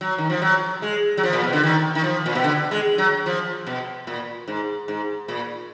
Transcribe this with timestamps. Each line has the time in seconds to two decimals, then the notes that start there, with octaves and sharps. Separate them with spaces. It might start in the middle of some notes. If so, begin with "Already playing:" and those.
0.01 F#3
0.18 D#3
0.30 F3
0.42 F#3
0.82 G#3
1.17 F#3
1.23 F3
1.33 A#2
1.44 B2
1.53 D3
1.63 D#3
1.95 D#3
2.04 F3
2.26 A#2
2.35 B2
2.44 D3
2.71 G#3
2.98 F#3
3.26 F3
3.66 B2
4.07 A#2
4.48 G#2
4.88 G#2
5.28 A#2